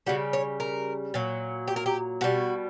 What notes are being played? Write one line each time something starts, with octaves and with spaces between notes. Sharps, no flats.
C#3 G3 F#4
C#5
A#4
A#2 F#3
G4
A#4
G4
B2 G3 F#4